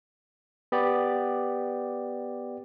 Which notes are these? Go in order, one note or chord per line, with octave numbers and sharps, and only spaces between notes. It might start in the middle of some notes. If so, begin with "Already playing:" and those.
B3 G4 D5